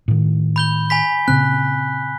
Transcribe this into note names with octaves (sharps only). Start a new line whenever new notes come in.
A2 D#3
B5 G6 G7
G#5 B5 B6
A#2 C#3 C4 F#6